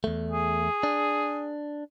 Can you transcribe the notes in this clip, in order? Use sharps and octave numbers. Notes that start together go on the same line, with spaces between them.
E2 A3
G#4
D4